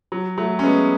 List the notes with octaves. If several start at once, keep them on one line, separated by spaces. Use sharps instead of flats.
F#3
F#3 A3
C#4
G#3 B3